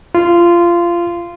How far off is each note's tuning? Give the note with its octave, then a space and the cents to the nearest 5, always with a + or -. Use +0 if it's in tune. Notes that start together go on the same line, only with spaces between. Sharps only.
F4 -20